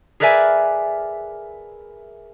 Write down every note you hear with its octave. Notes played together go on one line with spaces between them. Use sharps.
G#4 A#4 B4 D5 E5 G#5